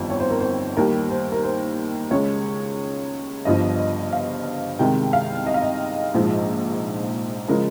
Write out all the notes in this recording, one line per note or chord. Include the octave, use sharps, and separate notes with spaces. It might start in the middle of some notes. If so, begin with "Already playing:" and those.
Already playing: G1 F2 D#3 G3
C#5
C5
A#4
C5
D#2 D#3 G3 A#4
C5
A#4
C5
C#2 C#3 G#3 C#5
G1 G2 F3 D#5
F5
C2 C3 D#3 G#3 G5
F5
D#5
F5
D#5
A#1 G#2 F3 G#3
C#3 F3 G#3 A#4